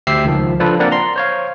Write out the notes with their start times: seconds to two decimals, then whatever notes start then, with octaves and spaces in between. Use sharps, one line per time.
0.07 D2 G4 C5 E5 E6 C7
0.25 C#2 D#3 F3
0.60 F3 D4 F4 A4 B4
0.79 A#3 C4 D4 A#4 D5 F#5
0.91 A#5 C6
1.16 C5 C#5 F5